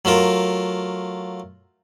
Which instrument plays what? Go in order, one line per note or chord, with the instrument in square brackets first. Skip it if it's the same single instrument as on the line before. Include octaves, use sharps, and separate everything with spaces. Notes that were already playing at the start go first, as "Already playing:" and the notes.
[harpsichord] F#3 A3 F4 A#4